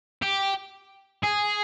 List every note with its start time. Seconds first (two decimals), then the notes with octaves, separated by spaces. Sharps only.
0.22 G4
1.23 G#4